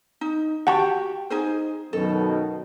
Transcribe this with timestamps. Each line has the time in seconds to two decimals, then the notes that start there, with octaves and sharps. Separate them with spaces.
0.21 D#4
0.67 F#4 G4 F#5 G5 A5 C#6
1.30 D#4 G#4 C5
1.93 F#2 B2 D#3 A4